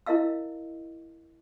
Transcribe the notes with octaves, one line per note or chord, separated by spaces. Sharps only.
E4 A#4 D#5 F5 E6